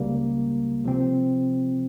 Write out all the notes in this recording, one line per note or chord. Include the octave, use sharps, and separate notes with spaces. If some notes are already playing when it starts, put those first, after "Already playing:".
Already playing: C#2 C#3 G3 A#3
C3 F3 C4